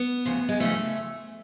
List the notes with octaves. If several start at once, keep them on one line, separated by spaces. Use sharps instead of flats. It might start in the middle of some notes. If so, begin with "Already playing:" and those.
Already playing: B3
D2 C#3 F3
G#3
D2 C#3 F3 A3